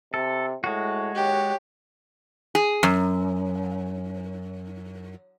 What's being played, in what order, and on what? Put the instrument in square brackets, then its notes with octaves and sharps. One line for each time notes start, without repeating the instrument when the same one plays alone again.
[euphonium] C3 [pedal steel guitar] A4
[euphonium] A2 [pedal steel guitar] G#3 F#4
[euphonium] D#2 [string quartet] G4 C#5
[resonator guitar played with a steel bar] G#4
F#2